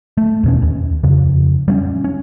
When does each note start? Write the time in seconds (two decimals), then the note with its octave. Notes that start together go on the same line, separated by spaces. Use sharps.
0.17 A3
0.44 E2 B2 C#4
0.62 D#2
1.03 F2 C#3
1.68 G3 C4 C#4
2.04 C#4